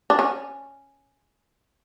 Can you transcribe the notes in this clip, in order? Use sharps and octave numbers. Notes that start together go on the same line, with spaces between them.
D4
C#4